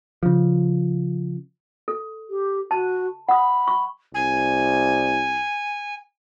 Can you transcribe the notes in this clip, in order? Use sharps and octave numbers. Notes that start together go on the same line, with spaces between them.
C#3 F3
A4
G4
F#4 A5
F#5 B5 D#6
C#6
C2 G#5